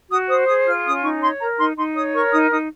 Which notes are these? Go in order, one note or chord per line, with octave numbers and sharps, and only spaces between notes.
F#4 D#6
C5 D#6
G#4 D#6
F4 F6
C#4 D#6
D#4 C#6
C#5 C6
A#4 A#5
D#4 C6
D#4 C6
C#5 D#6
A#4 C#6
D#4 D#6
D#4 D#6